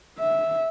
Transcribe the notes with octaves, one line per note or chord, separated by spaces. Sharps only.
E5